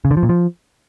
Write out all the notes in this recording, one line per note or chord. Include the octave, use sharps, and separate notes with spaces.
C#3
D3
F3
A#2
F3